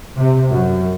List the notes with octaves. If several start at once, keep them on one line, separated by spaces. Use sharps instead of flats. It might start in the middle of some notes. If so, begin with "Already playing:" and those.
C3
F#2